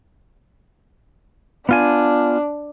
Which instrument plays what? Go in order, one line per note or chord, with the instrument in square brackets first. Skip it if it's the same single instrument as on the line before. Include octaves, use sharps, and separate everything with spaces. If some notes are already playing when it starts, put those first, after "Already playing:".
[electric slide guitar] B3 F4 G#5 [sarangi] D4